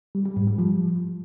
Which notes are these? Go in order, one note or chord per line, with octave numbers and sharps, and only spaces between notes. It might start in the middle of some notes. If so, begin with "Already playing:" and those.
G3
G3
G#2
G3
F3